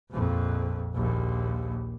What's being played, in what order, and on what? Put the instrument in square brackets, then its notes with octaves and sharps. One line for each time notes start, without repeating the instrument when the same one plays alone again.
[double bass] A#1 F2
A#1 D#2